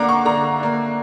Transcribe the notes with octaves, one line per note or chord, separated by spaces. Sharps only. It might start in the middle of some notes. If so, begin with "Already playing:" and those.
Already playing: D3 A#3 D4 F#5 A#5 D6
C#6
D3 A#5
A#3 D4